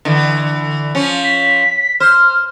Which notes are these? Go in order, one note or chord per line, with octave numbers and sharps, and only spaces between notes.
D3 E3
F3 C#4
B6
C5 F6